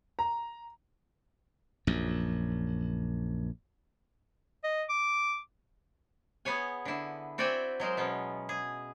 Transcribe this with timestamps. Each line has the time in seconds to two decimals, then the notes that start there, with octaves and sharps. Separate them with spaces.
0.19 A#5
1.87 A#1 F#2
4.64 D#5
4.89 D6
6.45 B3 G#4 C#5 G#5
6.85 D3 E4
7.38 C4 F#4 D5 E5 G5 G#5
7.80 F#3 G#3 A#4 C5
7.97 B2 B3 C#4
8.49 G#4